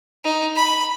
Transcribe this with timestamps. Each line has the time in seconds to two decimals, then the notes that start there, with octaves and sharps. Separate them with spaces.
0.24 D#4
0.56 B5